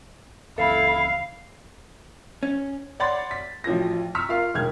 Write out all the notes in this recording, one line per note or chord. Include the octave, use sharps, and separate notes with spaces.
C#2 E3 E4 A4 F5
C#4
C#5 D5 F#5 B5 C6 A6
B6
A1 F3 F#3 A#6
A#5 C#6 E6 F6 B6
F4 A#4 F5
E1 D#2 D#3 F6 G#6